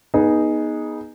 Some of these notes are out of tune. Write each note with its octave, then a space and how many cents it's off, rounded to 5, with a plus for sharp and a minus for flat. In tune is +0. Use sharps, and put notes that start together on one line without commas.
B3 -25 D#4 +0 G#4 +0